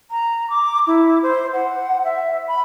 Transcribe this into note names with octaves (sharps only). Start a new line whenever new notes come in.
A#5
D6
E4
C5
F#5
E5
B5